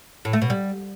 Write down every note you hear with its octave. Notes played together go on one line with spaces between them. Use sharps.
A2
A3
B2
G3